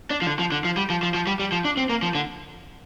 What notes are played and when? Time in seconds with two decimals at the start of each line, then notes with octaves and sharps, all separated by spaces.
0.11 D4
0.21 F3
0.27 D3
0.39 F3
0.52 D3
0.65 F3
0.77 G3
0.90 F3
1.03 F3
1.15 F3
1.27 G3
1.40 G3
1.52 F3
1.65 D4
1.77 C4
1.89 A#3
2.02 F3
2.15 D3